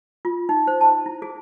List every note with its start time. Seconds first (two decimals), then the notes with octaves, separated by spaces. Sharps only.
0.25 F4
0.49 D#4
0.67 C5
0.81 A5
1.06 E4
1.22 G#4